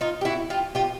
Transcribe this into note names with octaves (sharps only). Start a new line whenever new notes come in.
D#4 F4
G4
E4 F#4
F4 G4
F4 G4